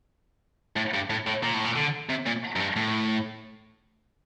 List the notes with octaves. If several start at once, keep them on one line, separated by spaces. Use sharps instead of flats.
A2
G2
A2
A2
A#2
A2
A#2
D3
C3
A#2
F#2
G2
A2